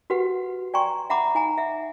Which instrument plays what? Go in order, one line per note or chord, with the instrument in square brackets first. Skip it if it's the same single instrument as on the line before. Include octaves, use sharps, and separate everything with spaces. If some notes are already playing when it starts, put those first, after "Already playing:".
[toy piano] F#4 G4 B4 F#5
D5 G5 G#5 A#5 C6 C#6
E5 F#5 A#5 B5 D6
D#4 G#5 A#5
E5 F#5